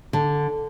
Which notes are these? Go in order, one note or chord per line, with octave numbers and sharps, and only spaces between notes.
D3